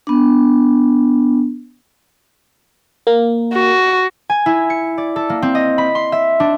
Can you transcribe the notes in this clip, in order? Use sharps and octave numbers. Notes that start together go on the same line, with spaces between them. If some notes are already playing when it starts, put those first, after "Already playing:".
B3 D4
A#3
F#4
G#5
E4
C#7
D5
A4
A#3
C4
D#5
B5
C6
E5
D4